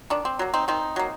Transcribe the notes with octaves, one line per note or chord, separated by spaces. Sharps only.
D#3 D4
C4
F#3 A#3
C4 D#4
D#3 C4 D#4
F#3 A#3